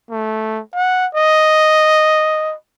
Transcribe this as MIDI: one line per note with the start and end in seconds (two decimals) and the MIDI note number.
0.11 0.61 57
0.74 1.07 78
1.15 2.54 75